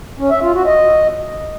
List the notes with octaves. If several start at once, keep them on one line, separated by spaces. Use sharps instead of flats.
C#4
E5
F4
F#4
D#5